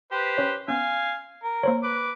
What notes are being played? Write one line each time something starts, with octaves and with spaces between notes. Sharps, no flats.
G4 B4 C5
C#4 C#5
B3 C#4 F5 G#5
A#4
A#3 C5 C#5
B4 D6